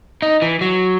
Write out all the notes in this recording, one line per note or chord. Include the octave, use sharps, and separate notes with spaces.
D#4
E3
F#3